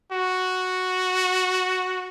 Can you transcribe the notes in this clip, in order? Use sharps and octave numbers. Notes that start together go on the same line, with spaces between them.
F#4